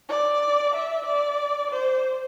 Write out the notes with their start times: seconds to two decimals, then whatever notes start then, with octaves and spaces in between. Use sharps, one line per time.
0.09 D5
0.74 E5
1.06 D5
1.71 C5